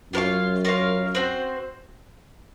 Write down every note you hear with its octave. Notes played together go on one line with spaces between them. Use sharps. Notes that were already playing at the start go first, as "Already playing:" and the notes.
F#2 F4 A#4 C#5 F5
F4 A#4 C#5 F5
C4 F#4 C5